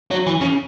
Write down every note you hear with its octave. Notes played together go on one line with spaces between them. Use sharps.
F#3
E3
C#3